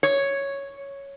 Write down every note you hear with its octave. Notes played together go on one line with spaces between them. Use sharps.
C#5